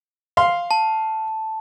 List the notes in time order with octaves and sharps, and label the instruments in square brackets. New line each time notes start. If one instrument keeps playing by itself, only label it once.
[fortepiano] F5 C6
[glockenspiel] A5